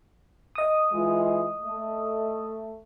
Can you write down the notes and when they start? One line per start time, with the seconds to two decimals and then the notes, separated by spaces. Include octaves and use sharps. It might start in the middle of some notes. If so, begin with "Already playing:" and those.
0.55 D#5 D#6
0.92 E3 G#3 F4
1.61 A3